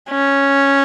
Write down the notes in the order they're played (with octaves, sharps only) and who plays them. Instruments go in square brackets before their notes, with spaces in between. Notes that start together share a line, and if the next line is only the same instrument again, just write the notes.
[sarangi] C#4